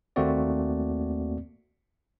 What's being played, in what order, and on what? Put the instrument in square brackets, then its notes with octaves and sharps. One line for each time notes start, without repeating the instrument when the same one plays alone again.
[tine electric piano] D#2 A3 A#3 C4 F#4 D5